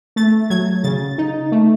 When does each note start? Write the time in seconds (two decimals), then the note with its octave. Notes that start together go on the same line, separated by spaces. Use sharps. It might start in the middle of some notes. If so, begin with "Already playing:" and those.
0.16 A3 A6
0.50 F#3 G#6
0.84 C#3 A6
1.18 D#4
1.52 A3